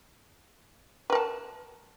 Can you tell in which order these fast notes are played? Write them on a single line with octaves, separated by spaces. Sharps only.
B4 A#4 A5